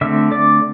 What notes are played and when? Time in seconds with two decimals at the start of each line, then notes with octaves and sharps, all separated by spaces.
0.01 D3 A3 C4 E5 E6
0.32 D5 D6